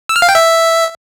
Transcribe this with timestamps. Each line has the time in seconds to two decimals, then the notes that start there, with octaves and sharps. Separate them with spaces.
0.09 E6
0.16 F6
0.22 F5
0.29 G5
0.35 E5